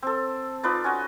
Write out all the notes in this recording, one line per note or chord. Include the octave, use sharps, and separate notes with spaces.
C4 A4
D#4 F4 B4 D5
C#4 F#4 D#5